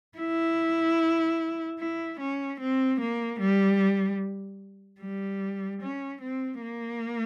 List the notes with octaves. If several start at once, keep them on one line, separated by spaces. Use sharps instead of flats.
E4
E4
C#4
C4
A#3
G3
G3
C#4
C4
A#3